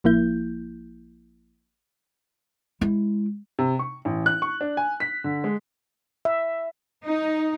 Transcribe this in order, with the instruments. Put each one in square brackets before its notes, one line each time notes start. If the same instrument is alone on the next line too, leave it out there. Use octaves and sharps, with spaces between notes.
[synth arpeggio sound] A1 F3 A#3 E4 G6
[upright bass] G#3 E4
[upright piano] C3
C#6
A1
F#6
C#6
D4
G#5
B6
D3
G#3
[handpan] E5
[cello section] D#4